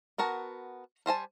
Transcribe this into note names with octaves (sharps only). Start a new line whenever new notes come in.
B3 F#4 A#4 A5
G3 C5 G#5 A5